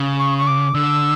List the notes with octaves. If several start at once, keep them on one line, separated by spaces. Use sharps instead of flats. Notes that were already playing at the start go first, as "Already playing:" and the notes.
Already playing: C#3
C#6
C#6
D6
D3 E6